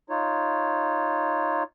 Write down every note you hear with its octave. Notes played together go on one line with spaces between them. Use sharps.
D#4 F4 C#5